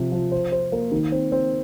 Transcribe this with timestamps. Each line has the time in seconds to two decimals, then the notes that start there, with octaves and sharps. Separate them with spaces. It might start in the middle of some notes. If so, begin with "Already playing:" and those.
Already playing: C3 F3
0.12 F3
0.32 C5
0.52 C5
0.72 A#3
0.92 D#3
1.12 C4
1.32 C4